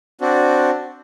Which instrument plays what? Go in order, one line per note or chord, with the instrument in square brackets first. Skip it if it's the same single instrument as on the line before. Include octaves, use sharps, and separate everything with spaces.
[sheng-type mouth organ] C4 D4 F#4